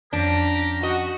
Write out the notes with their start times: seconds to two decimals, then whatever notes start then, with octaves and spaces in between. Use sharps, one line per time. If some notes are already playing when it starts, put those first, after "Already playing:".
0.13 F2 C#4 D4 G4 A#4 A#5
0.83 F#4 D#5